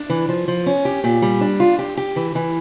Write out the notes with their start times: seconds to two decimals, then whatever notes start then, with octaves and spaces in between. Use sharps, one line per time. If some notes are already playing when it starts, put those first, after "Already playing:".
Already playing: D4
0.10 E3
0.29 F3
0.48 F3
0.66 C#4
0.85 G4
1.04 A#2
1.22 G3
1.41 D4
1.60 F4
1.79 G4
1.97 G4
2.16 E3
2.35 E3